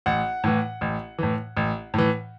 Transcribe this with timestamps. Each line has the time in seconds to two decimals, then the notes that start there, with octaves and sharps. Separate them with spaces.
0.06 A1 F#5
0.44 A2 E3
0.81 A1
1.19 A2 E3
1.57 A1
1.94 A2 E3